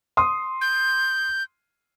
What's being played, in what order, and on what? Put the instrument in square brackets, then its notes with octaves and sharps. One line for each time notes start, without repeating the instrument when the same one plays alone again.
[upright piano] C6 D#6
[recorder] G6